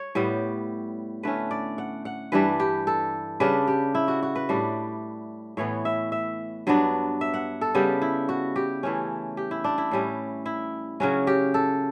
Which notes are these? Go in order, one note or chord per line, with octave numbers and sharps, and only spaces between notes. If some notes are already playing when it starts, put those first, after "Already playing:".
Already playing: C#5
A2 G3 B3
D3 A3 C#4 B4
D5
F#5
F#5
G2 E3 G3 D4 B4
G4
A4
C#3 G3 D4 B4
G4
E4
F#4
F#4
B4
A2 G3 D4
A2 E3 B3 C#5
E5
E5
G2 F#3 B3 D4
E5
F#5
A4
C#3 G3 B3 G4
E4
F#4
G4
E3 A3 C#4
G4
E4
D4
E4
A2 G3 C#4
E4
C#3 F#3 C#4 F#4
G4
A4